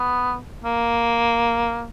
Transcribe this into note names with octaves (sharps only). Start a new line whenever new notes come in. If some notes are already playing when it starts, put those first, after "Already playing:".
Already playing: B3
A#3